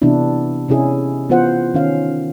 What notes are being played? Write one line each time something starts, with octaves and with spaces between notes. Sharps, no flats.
C3 E3 B3 D4 E4
C3 C#4 E4 G#4
E3 B3 F4 C5 F#5
D#3 C#4 F5